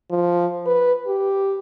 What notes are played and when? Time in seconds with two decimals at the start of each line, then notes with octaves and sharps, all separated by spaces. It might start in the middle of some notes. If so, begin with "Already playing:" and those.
0.11 F3
0.66 B4
1.07 G4